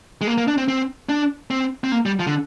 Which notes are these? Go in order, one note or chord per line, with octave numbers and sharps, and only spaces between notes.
G#3
A#3
A#3
D4
C4
C4
D4
C4
C4
A#3
G3
F3
D3